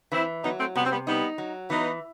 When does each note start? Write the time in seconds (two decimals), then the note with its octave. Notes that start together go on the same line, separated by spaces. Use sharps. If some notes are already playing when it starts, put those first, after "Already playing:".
0.12 E3 C4 E4
0.43 F#3 B3 D#4
0.59 A3 C4
0.75 C3 G3 B3
0.84 C4
0.91 G3 B3
1.06 G3 B3 D#4
1.38 F#3
1.70 E3 B3 D#4